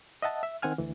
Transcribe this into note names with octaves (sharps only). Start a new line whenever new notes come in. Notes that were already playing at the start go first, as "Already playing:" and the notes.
D#5 E5 F#5 A5
E5
D#3 C4 F#5 G#5 F6
D2 E3